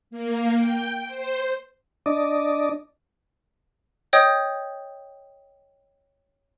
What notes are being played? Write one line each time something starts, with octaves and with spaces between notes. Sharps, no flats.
A#3
G5
C5
D4 D5 D#5
C#5 D#5 G5 D#6 G6